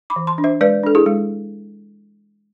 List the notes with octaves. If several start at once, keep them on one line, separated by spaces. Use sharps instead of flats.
B5 D6
E3
A5 C6
D4
C5 E5
G#3 B4 D5
D4 A4
E4 G#4
G#3